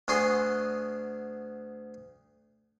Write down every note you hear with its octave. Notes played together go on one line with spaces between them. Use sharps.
D2 B3 F#4 G#4 C6